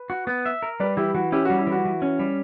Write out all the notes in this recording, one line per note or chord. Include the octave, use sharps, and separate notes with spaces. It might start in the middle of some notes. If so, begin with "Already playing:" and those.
Already playing: B4
F#4
B3
E5
A#4
G3 B4 D5
E3 E4 G4
E3 F#4
C#4 E4 G4
F#4
G3
E4
E3
F#4
E3
C#4
G3